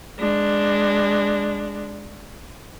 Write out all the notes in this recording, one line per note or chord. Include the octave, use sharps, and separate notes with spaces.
G#3 D4